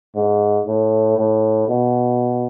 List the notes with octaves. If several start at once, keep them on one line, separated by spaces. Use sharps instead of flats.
G#2
A2
A2
B2